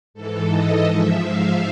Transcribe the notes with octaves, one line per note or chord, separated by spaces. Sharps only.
G#2 E3 A4
D#5
G#2 F3 E5
F5